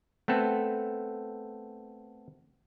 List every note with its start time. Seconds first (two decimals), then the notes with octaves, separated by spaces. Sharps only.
0.28 A3 B3 C4 A4